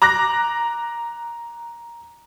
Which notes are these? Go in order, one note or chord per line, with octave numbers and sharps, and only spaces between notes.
A#5 D6 F#6 A#6